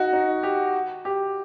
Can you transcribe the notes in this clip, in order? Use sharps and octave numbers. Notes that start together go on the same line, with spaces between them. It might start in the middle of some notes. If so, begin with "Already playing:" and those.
Already playing: D#4 F#4
D#4
G4
G4